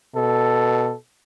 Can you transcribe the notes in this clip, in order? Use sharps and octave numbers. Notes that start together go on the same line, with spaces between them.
B2 A4